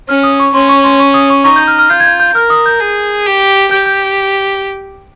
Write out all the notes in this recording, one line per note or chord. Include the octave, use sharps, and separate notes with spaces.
C#4 F6
D#6
C#6
C#4 C6
C#6
C6
C#6
D#6
C#6
D#4 C#6
G6
F6
F6
F4 G6
G#6
G6
G6
A#4 F6
D#6
G6
G#4
G4
G4 G6
G6